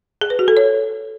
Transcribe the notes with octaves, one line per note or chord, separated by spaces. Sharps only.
G#4
B4
F#4
A4
C#5